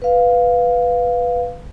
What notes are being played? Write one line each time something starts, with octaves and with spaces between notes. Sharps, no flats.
B4 F5